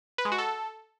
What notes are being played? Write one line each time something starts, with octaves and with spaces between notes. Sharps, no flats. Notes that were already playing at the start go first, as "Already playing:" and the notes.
B4
G#3
F#4
A4